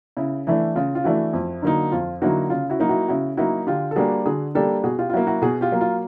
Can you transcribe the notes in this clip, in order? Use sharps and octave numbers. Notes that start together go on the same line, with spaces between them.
C#3 E4
E3 A3 D4 E4
C#3 F4
F4
E3 A3 D4 E4 F#4
F2
D3 F#3 A#3 D#4
F2 F4
D3 F#3 A#3 D#4 E4 F#4
C#3 F4
E4 F#4
F#3 A#3 D#4
E4 F#4
C#3 E4 F#4
F#3 A#3 D#4 E4 F#4
D3 F4 G4
A4
G3 A#3 D4 F#4 G#4
D3 F#4 G#4
G3 A#3 D4 G4 A4
B2 F#4 G#4
F4 G4
F4
F#3 A#3 E4 F#4
E4 F#4
B2 F#4 G#4
F4 G4
F#3 A#3
F4